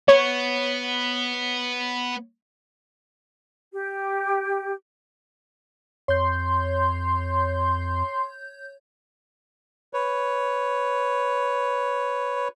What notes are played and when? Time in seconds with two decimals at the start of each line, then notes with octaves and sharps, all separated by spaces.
0.08 B3 C#5
3.73 G4
6.08 F2 C#5 C6 G6
9.93 B4 C#5